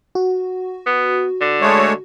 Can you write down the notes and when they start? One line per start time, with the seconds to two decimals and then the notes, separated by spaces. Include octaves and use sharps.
0.15 F#4
0.86 B3
1.41 D3
1.61 G#3 A3 C#5